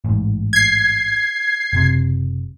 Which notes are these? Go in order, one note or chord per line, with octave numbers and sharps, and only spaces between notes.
A1 G#2
G#6 C7
F#1 C3